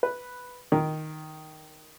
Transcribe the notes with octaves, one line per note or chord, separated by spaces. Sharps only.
B4
D#3